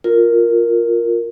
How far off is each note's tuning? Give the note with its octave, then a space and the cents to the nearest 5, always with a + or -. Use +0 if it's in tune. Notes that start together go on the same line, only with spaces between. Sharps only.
F4 +0 A#4 +0